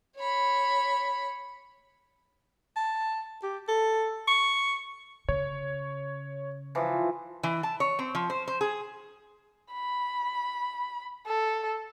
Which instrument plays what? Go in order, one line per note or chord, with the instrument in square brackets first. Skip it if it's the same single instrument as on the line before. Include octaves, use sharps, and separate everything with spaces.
[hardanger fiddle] C#5 B5
[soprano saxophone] A5
G4
A4
C#6
[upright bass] C#3 [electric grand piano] C#5
[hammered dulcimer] E3 F3
[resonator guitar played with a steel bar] E3
A5
C#5
C4
F3
C5
C5
G#4
[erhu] B5
A4